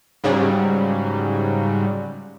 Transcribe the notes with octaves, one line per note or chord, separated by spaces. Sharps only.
G#2 C#3 F#3 G3